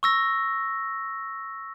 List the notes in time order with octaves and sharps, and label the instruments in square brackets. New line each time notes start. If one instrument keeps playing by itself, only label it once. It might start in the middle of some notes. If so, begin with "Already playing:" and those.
[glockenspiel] C#6 E6 A#6